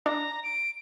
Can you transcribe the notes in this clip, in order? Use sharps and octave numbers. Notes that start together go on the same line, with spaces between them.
D4 A#5
D7